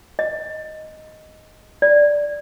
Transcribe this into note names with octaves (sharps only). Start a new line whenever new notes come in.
D#5
D5